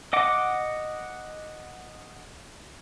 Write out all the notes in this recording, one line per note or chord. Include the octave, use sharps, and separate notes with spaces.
D#5 F#5 D6